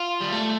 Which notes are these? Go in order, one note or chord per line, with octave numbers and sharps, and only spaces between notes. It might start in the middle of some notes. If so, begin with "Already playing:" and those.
Already playing: F4
G3
A3